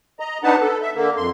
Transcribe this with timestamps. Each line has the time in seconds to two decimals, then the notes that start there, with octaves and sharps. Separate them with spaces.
0.20 D#5 A#5
0.43 B3 D4 D#4 B4 F#5 A5
0.61 A4
0.82 E5
0.96 D3 A#3
1.17 F2 C6